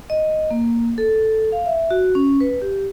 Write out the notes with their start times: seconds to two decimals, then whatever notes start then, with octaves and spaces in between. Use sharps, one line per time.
0.10 D#5
0.51 A#3
0.98 A4
1.52 F5
1.66 E5
1.91 F#4
2.15 C#4
2.40 B4
2.62 G4